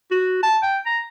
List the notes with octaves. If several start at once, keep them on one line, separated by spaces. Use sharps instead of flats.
F#4
A5
G5
A#5